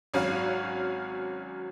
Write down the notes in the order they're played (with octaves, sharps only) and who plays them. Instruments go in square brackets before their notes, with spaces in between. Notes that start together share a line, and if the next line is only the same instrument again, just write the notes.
[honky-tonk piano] G#1 F#3 C#4 F#4 F5